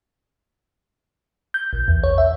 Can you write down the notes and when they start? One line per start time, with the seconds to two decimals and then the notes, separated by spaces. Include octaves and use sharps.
1.54 G6
1.73 A#1
1.88 E2
2.04 C#5
2.18 E5